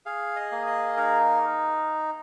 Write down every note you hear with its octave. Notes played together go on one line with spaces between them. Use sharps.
G#4 F5
D#5
A#3
D#5
D#4 A#4